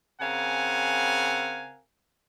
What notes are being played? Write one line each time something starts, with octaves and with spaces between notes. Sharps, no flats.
C#3 C4 A#4 F5 F#5 G#5